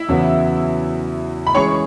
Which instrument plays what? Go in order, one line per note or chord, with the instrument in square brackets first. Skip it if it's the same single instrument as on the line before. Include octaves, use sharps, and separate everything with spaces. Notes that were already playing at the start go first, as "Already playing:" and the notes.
Already playing: [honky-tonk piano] E4 E5
[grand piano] E2 C#3 F#3 B3
[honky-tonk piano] B5
[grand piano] E3 G#3 C#4 G#4 [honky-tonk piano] C#5 C#6